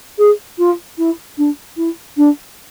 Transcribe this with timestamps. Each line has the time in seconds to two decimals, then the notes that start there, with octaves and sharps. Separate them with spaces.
0.18 G#4
0.58 F4
0.98 E4
1.37 D4
1.77 E4
2.16 D4